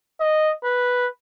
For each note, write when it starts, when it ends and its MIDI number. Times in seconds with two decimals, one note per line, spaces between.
0.20 0.53 75
0.64 1.08 71